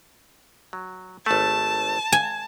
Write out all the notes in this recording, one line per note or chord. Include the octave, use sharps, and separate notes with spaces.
F#3
G#1 A3 A5
G#5